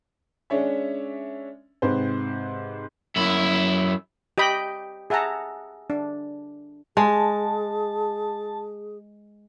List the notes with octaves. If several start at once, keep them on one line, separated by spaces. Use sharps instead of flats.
G#3 C#4 D4 C#5 E5
G#2 C3 C4 B4 C5
F#2 E4
G4 D#5 G5 B5
G#4 E5 F#5 A5 A#5
D4
G#3 G#4 A5